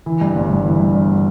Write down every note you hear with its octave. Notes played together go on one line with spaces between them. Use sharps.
E3
G2
G1
G1
E3
G2
G1